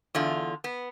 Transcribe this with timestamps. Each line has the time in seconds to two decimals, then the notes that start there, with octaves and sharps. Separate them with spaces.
0.15 E2 D3 F4
0.64 B3